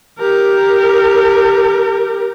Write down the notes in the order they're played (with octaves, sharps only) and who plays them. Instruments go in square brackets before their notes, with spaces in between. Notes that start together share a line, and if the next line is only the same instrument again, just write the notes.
[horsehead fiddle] G4 A#4